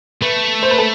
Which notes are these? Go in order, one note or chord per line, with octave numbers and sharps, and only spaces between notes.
A3 B4
C5
B4
A4